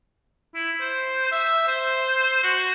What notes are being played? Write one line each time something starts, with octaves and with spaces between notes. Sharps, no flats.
E4
C5
E5
C5
F#4